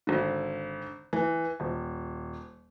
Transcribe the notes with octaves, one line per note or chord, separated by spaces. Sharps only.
G#1 D3
E3
D#1